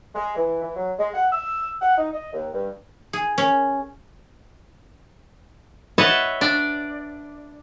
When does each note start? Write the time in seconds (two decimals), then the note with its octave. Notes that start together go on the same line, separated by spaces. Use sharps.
0.15 G#3
0.37 E3
0.61 E3
0.76 F#3
0.98 G#3
1.14 F#5
1.32 E6
1.80 F#5
1.97 D#4
2.13 D#5
2.33 D#2
2.53 G2
3.13 G#4
3.38 C#4
5.98 B4 C#5 D#5 E5 F#5 A5
6.41 D4 D5